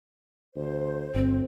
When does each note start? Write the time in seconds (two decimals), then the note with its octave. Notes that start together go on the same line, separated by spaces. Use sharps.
0.56 D2 C5
1.15 G1 D2 C4